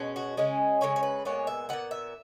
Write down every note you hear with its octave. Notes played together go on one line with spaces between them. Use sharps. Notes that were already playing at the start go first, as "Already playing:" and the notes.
Already playing: B2 G#3 C#4
F#4
C#3 G#3 C#4 G#4
C#3 G#3 C#4 C#5
C#5
B4
A#2 G#3 B3 C#5
E5
A#2 G#3 B3 F#5
E5